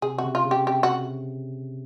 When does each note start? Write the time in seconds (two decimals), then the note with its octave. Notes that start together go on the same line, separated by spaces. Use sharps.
0.02 C3 G#4
0.18 C3 F#4
0.24 C#3
0.35 F4
0.45 C#3
0.51 G4
0.66 C3 G4
0.83 F#4